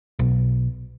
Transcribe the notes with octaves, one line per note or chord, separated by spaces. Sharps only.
B1